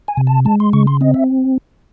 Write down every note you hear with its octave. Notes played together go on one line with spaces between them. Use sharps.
G#5
C3
A5
G#3 A5
C6
C#3 C#6
C6
C4 D#5
E5